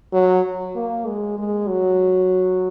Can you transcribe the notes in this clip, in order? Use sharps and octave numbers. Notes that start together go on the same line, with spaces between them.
F#3
A#3
G#3
G#3
F#3